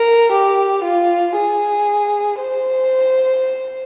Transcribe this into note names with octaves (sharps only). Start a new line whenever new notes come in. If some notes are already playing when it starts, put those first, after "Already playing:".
Already playing: A#4
G4
F4
G#4
C5